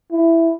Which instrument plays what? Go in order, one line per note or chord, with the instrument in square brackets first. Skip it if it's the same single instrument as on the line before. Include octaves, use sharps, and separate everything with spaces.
[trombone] E4